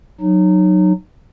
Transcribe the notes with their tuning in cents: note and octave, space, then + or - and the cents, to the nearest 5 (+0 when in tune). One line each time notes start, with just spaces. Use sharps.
F#3 -5 D#4 -25